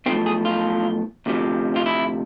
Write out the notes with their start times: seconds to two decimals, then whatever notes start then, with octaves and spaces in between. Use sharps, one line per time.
0.06 B1 A2 F3 C4
0.26 G#4
0.45 F4
1.26 D2 C3 F3
1.76 F4
1.86 E4